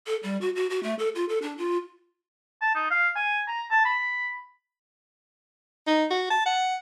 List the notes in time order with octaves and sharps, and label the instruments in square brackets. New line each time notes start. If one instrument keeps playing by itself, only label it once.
[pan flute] A4
G3
F#4
F#4
F#4
A3
A4
F4
A4
D4
F4
[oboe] A5
D#4
F5
G#5
A#5
A5
B5
[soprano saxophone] D#4
F#4
A5
F#5